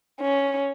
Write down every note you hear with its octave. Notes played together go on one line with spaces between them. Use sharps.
C#4